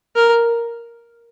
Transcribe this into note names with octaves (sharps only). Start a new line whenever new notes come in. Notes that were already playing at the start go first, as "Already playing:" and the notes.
A#4